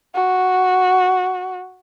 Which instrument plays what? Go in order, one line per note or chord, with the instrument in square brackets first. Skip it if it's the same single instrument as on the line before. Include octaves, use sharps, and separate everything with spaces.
[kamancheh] F#4